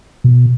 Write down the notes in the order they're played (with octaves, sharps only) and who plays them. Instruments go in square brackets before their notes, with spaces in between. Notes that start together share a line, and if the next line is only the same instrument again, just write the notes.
[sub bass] B2